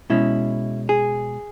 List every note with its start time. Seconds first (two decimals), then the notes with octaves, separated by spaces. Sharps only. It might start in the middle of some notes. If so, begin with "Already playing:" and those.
0.10 B2 G#3 C#4 E4
0.89 G#4